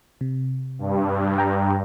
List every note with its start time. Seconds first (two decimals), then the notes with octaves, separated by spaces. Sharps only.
0.21 C3
0.79 G2
1.38 G5 A#5